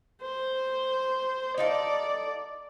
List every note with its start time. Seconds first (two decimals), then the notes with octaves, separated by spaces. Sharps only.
0.22 C5
1.58 D#4 A4 D5 F5